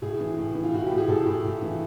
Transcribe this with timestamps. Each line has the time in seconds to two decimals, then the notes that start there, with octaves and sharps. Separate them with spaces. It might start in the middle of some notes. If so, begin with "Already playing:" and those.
0.02 A2 G#4
0.20 E3
0.38 A2
0.55 E3
0.64 F4
0.73 A2 F#4
0.86 A2 G4
0.98 G#4
1.08 A2 A4
1.26 A2
1.44 A2
1.62 E3